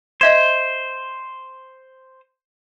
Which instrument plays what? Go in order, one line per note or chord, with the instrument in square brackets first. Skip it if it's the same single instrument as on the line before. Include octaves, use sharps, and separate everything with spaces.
[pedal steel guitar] C5 [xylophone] D#5 E5 G#6